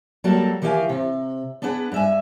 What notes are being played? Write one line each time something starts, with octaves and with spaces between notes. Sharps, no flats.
F#3 G3 A#3 F#4 A4
D#3 E3 G4 E5 F5 G#5
C3
B3 D4 G#4 B4 F#5
G2 E5 G#5